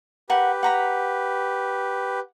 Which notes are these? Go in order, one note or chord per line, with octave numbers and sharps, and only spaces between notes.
G4 A#4 B4 F#5
F#5 A#5 B5